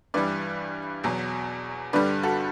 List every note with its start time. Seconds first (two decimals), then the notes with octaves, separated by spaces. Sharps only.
0.14 G2 E3 G3 B4 D5
1.04 E2 B2 F#3
1.93 G2 D3 G3 B4 D5
2.23 F#4 A4